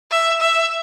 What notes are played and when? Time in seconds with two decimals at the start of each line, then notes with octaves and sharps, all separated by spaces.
0.11 E5
0.41 E5